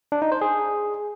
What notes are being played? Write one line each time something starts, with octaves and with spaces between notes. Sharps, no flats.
D4
D#4
C5
G#4